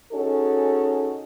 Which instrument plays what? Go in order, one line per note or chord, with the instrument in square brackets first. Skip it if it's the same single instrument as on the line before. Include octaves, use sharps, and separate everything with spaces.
[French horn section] C#4 D#4 F#4 G#4 A4